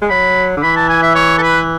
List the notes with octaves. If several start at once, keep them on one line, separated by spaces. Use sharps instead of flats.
G#3
F#3 B5
D3
E3 B5
A5
G#5
E5
C#5
A4
B4